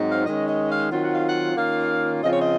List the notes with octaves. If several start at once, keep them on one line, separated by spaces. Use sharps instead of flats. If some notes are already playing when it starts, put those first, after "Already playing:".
Already playing: G#2 F#3 C4 D#4
F5
D#3 G#3 C#4 D#5
D#5
F5
D#3 F#3 C4 F4
F#5
F5
F#5
D#3 A#3 C#4 F4 F5
C#3 F3 C4 F4 D#5
C#5
D#5